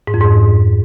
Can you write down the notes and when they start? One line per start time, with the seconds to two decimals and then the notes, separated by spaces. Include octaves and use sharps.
0.07 G#2
0.14 F2
0.21 G#2